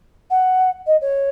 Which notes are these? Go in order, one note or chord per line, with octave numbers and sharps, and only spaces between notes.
F#5
D#5
C#5